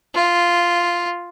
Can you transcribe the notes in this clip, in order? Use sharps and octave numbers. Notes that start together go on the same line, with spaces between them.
F4